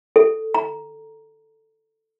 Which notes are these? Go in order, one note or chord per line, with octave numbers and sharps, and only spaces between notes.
A4
A#5